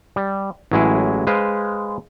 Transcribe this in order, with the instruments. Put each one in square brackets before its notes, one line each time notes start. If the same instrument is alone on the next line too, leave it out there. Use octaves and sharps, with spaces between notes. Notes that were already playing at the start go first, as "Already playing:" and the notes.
[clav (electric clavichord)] G3
A1 F#3 G#3 E4 G#4
G#3 B4 C5 F5